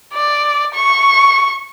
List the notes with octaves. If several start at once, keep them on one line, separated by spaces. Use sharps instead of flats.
D5
C#6